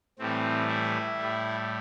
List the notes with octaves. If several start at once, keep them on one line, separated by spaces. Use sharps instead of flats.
A2 E3 G3 C4
E4
A2 G3